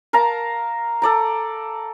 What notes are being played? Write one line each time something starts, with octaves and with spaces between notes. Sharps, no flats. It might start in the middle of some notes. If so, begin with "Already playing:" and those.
A#4 F5 A5 A#5
A4 D5 A#5